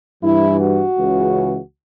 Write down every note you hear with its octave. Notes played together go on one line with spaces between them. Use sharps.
G2 E3 E4
F#4
C#2 C#3 E3